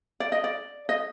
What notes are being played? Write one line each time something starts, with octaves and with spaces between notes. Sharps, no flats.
D5
D#5
D5
D#5